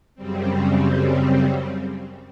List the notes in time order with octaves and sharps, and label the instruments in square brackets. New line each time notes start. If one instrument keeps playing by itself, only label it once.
[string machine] F#2 C#3 G3 C4